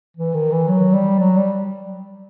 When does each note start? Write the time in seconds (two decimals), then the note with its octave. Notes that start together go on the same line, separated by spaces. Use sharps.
0.16 E3
0.34 D#3
0.51 E3
0.68 F#3
0.93 G3
1.19 F#3
1.37 G3